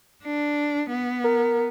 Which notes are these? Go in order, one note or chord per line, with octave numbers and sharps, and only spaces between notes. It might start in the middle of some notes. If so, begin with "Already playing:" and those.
D4
B3
A#4